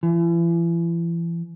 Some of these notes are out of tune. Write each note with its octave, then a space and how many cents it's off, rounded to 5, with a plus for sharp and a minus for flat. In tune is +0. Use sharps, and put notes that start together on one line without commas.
E3 +35